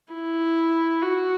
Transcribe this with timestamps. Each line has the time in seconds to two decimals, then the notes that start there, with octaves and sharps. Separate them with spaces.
0.13 E4
1.02 F#4